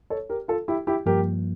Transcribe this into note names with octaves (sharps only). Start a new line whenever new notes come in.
A4 C#5
G4 A#4
F4 A4
E4 G4
E4 G4
G2 F3 A#3 G4 A#4